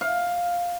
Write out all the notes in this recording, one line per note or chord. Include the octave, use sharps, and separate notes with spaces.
F5